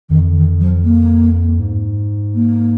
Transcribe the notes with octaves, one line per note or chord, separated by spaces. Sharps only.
F2 D#3
D#3
F3
A#3
G#2
A#3